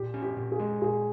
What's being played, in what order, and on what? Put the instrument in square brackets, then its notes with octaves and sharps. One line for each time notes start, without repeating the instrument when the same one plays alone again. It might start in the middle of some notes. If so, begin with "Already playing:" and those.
Already playing: [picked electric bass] A#2 [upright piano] G4
[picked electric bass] C#4
[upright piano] G4
[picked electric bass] A#2
[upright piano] G#4
[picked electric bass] G#3
[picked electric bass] A#2 [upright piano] G#4